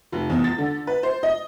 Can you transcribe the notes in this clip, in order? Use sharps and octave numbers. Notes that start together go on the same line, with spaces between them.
F1
E2
A6
D3
B4
C5
D#5